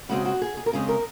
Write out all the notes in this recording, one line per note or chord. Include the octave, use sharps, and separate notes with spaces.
C#3 G#3 C4 F#4
F#4
G#4
G#4
A#4
C#3 G#3 C4 G#4
A#4